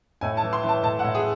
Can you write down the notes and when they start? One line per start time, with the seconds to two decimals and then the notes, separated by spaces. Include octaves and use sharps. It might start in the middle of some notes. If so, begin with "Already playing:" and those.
0.21 A2 G#5
0.37 A5
0.43 E3
0.53 C6
0.64 E3
0.69 A5
0.83 A2 A5
0.99 F#5
1.04 A2
1.15 G#4